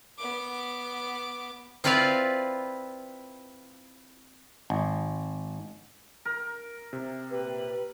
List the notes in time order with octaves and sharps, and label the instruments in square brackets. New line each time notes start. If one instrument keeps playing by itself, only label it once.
[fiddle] B3 D6
[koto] C4 E4 F4 B4 D5 F5
[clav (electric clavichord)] G#1
[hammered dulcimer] A#4
[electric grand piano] C3
[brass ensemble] A#2 G4 [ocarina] B4